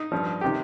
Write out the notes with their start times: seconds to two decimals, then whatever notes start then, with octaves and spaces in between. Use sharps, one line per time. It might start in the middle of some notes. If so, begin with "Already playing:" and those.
Already playing: D#4
0.12 G2 F3
0.41 C3 D#3 G4